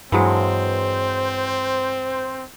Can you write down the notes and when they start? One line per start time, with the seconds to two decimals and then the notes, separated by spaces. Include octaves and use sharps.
0.12 G2 E3 F#3 G#3 C4 C5